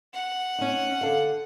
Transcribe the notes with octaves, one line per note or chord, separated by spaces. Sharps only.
F#5
C#4 D#4
D3 A4 F5